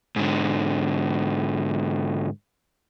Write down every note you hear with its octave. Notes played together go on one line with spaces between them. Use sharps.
G#2 D3